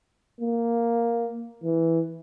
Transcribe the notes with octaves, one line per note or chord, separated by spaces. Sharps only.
A#3
E3